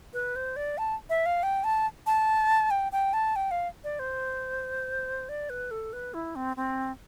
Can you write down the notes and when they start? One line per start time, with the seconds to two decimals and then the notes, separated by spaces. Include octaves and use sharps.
0.13 B4
0.36 C5
0.56 D5
0.78 A5
1.10 E5
1.26 F5
1.43 G5
1.64 A5
2.06 A5
2.71 G5
2.92 G5
3.13 A5
3.36 G5
3.51 F5
3.84 D5
3.99 C5
5.29 D5
5.49 B4
5.71 A4
5.93 B4
6.14 E4
6.35 C4
6.56 C4